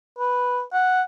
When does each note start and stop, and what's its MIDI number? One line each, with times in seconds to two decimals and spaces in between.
0.18 0.63 71
0.73 1.02 78